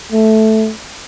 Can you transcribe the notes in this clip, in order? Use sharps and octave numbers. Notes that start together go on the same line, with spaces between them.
A3